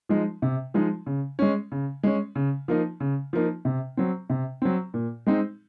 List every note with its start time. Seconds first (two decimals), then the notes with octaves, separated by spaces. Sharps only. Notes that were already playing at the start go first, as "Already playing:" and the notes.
0.09 F3 G#3 D#4
0.42 C3
0.74 F3 G#3 D#4
1.06 C#3
1.39 G#3 C#4
1.72 C#3
2.03 G#3 C#4
2.35 C#3
2.68 F3 A#3 D#4
3.00 C#3
3.33 F3 A#3 D#4
3.65 C3
3.97 F#3 C4
4.30 C3
4.62 F#3 C4
4.94 A#2
5.27 G#3 C4 D#4